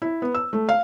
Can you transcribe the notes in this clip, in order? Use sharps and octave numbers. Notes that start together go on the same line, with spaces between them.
E4
B3
E6
A3
F5